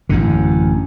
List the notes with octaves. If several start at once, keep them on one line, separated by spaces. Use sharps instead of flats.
A1 F#2 D3